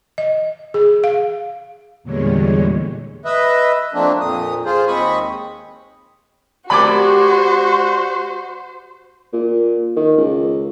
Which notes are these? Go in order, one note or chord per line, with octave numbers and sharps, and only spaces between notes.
D#5
G#4
F5
E2 A#2 D3 G3 G#3 C#5
B4 D#5 E5
F3 A3 A#3 C4 D4
F2 A#2 D#6
F4 G#4 C5
D#2 G#3 C4 B5 C#6 D#6
G#3 F#4 G4 C5 D5 B5 D6
A#2
D#3
C#2